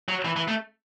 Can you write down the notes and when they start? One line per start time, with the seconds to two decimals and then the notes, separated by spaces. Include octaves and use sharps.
0.09 F#3
0.25 E3
0.36 E3
0.48 A3